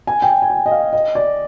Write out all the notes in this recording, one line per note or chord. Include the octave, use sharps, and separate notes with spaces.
G#5
G5
G#5
G5
D#5
F5
D#5
D5